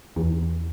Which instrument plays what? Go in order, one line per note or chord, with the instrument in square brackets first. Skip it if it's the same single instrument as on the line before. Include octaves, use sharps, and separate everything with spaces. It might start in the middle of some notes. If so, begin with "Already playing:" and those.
[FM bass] E2